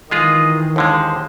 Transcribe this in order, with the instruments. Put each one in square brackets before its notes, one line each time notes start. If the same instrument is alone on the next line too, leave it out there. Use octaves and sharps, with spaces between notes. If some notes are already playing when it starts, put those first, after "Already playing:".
[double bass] D#3 E3 [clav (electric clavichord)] G#3 F4 G#4 [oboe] D#5
[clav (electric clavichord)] D#2 D3 G#3 [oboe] C5